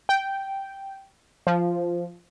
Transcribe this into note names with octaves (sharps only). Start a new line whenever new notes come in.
G5
F3